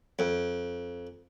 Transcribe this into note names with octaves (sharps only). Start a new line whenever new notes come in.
F2